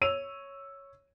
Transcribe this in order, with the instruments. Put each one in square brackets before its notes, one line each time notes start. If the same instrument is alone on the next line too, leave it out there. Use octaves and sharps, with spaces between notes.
[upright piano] C#5 E6 D#7 F7